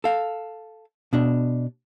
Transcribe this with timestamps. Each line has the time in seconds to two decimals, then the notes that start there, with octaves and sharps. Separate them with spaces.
0.04 A4 F5
1.13 B2 D4